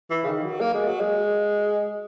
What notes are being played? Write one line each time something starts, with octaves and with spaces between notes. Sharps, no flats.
E3
C#3
D#3
F#3
A#3
G#3
F#3
G#3